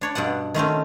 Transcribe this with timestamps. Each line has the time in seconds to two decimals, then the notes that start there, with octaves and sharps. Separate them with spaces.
0.01 D4 C#5 D5
0.15 G2 B2 D5 F#5
0.54 D#3 A3 C4 C#4